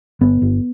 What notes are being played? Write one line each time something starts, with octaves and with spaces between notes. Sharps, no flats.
G1 B3
G1